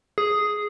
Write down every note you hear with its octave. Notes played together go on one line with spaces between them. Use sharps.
G#4